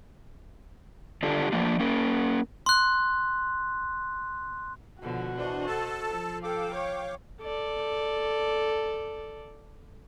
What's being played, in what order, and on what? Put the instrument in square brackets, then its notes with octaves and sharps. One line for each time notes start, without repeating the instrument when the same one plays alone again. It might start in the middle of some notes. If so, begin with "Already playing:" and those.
[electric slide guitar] D3 D4 F4 G4 A4
F3 A3 A#3 D4 F4
A#3 C#4 A#4
[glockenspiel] C6 F#6
[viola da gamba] B2 D3 F3 [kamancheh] F#4
[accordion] E3 D4 [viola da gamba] C5 D#5
[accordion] A4 A5
[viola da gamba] F3
[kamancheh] A4 [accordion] F5 G5 D6
[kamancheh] C#5
[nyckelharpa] A4 D5